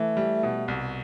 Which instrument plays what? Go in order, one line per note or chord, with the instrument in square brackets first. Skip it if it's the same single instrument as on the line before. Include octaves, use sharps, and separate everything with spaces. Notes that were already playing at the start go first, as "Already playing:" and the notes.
Already playing: [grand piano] E3 [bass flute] A3
[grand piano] G3
B2
C2